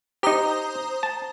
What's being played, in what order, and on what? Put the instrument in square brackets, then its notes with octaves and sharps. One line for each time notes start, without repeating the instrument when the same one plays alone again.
[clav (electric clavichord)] D#4 G4 [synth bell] C5 A#5 D#6
[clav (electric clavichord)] A5